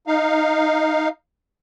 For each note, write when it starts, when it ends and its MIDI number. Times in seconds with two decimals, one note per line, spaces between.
0.07 1.08 63
0.07 1.08 77